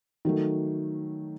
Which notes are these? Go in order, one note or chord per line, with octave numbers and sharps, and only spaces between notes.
D#3 F#3 A3